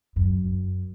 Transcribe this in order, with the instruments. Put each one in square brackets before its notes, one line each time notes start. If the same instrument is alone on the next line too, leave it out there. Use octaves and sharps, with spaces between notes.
[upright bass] F#2